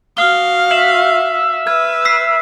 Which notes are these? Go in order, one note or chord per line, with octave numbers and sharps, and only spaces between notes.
F#4 F5 D#6 F6 G7
E5 F#7
B4 F6 G#6
E6 B6 C7